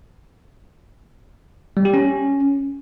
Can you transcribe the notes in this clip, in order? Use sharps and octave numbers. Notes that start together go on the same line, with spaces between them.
G3
G4
C#4